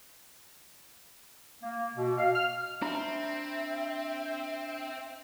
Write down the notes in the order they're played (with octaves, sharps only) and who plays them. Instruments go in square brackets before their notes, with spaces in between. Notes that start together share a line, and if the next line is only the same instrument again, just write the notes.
[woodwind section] A#3
B2
F5
F6
[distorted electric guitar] C4 [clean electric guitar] D4 A#5 B5 [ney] E5